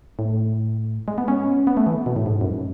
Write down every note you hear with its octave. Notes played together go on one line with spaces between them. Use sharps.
A2
G#3
B3
C#4
B3
A3
E3
B2
A2
G#2
F#2